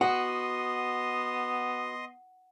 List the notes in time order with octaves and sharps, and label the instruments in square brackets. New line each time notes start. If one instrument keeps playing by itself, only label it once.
[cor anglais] B3 [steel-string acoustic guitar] F#4 [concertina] D#5 C6 D#6 [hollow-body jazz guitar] F#5